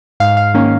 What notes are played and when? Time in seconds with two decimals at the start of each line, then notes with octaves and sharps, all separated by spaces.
0.20 G#2 F5
0.37 F5
0.54 D#3 A#3 C#4